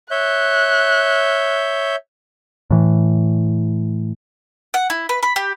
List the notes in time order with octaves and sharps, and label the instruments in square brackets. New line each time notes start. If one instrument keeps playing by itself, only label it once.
[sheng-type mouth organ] C#5 E5 G6 [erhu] F#6
[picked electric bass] A2 E3
[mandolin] F#5
E4
B4
B5
G4